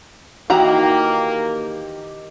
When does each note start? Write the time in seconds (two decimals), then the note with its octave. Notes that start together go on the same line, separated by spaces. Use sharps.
0.50 D#3 E3 A#3 D#4 F#4 G4 A#5